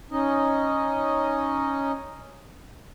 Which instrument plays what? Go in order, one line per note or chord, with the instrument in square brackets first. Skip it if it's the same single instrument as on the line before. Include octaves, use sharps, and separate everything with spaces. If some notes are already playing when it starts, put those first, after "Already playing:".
[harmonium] C#4 D#4 D#5